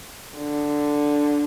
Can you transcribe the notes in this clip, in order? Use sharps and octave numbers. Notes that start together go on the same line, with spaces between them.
D3